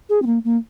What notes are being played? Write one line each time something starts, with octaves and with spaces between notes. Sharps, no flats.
G#4
C4
A#3
A#3